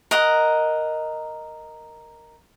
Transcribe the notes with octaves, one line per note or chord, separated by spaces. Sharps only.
A#4 D#5 F#5